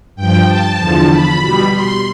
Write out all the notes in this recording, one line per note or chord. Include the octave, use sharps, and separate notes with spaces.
G2 F3 G5
A5
E2 D3 F3
B5
B2 G3
C6